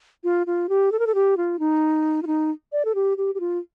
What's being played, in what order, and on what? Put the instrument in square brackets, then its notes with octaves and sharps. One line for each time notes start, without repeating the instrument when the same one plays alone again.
[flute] F4
F4
G4
A4
A#4
A4
G4
F4
D#4
F4
D#4
D5
A4
G4
G4
G4
F4